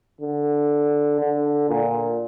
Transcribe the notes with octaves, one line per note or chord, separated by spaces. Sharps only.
D3
D3
A#2